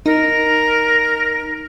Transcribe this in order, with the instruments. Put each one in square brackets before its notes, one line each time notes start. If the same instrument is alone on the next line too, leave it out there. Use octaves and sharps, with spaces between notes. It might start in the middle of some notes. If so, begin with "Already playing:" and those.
[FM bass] D#4 [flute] A#4